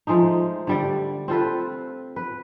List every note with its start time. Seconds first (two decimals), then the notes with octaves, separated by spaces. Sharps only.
0.07 F3 G#3 A3 D#4
0.67 D3 G3 D5
1.28 C4 F4 A4 B4
2.16 B4